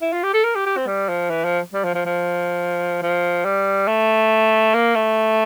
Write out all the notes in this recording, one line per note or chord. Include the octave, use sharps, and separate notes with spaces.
E4
F4
G4
A4
A#4
G4
G4
C4
G3
F3
E3
F3
G3
F3
F3
F3
F3
G3
A3
A#3
A3